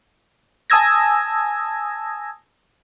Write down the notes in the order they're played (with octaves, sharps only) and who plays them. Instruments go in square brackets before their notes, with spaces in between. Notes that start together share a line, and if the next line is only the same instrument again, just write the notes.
[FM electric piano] G#5 A5 D#6 E6 G#6 A#6